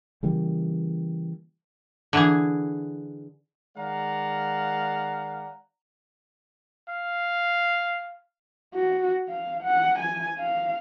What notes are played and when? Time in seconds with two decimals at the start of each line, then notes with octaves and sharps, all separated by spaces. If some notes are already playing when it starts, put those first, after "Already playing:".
0.23 C#3 E3 G3 A#3
2.13 D3 E3 G#4
3.77 D#3 G#3 D5 F5 F#5 A#5
6.88 F5
8.74 F#4
9.28 F5
9.63 F#5
9.99 G#5
10.38 F5